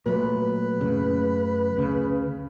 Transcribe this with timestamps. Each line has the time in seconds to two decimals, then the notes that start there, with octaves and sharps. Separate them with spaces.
0.06 A#2 F#3 A3 B4
0.81 F#2 A2 C#3
1.77 D2 C#3